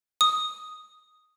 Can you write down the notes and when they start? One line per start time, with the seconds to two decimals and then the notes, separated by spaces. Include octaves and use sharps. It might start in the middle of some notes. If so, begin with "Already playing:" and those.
0.21 D#6